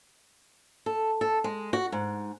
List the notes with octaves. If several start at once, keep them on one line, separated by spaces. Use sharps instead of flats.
A4
A4
G#3
F#4
G#2